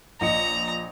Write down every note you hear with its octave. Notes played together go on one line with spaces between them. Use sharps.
A#1 D#5 A#5 C#7